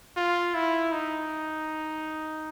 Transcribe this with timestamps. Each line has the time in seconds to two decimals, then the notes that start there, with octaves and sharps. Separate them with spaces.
0.17 F4
0.54 E4
0.92 D#4